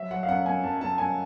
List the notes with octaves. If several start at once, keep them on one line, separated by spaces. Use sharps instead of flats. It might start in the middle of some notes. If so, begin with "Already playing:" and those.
Already playing: F#3 E5
F#3 F#5
F5
F#2 F#5
F#2 G#5
F#2 A5
F#2 A5
F#2 G#5